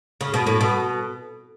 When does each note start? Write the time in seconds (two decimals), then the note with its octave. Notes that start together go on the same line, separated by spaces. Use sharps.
0.21 C#3
0.34 B2
0.47 A2
0.61 B2